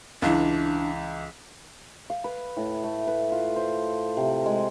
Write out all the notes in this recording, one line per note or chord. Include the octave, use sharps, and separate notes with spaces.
C#2 E3 D4
F5
B4
A2
A3
B4
F4
C5
C3
G#3